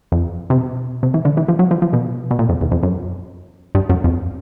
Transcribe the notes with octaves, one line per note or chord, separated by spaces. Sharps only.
F2
C3
B2
C3
E3
D3
E3
F3
F#3
F3
F3
B2
B2
A#2
F2
E2
F2
F#2
G2
F#2
F2